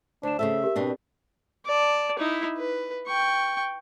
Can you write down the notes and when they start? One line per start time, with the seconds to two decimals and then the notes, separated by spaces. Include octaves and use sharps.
0.23 D2 D4 C5 E7
0.39 C#3 A3 A4 E5
0.64 G4 A#4
0.76 B2 C4 D4
1.65 D5 A5
2.19 D#4 E4
2.57 B4
3.07 G5 C#6